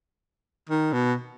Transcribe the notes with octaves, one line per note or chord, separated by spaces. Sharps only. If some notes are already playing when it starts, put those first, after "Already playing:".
D#3
B2